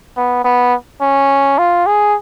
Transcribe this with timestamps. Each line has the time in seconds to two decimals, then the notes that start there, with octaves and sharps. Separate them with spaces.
0.17 B3
0.44 B3
1.01 C#4
1.58 F4
1.86 G#4